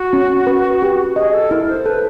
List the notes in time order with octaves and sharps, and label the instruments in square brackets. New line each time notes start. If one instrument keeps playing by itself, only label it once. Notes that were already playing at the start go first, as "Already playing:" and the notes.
Already playing: [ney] F#4
[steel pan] C#4
B4
G4
[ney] G#4 [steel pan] D#5
[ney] A4
[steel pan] E4 [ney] A#4
[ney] C5
[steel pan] A4 [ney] B4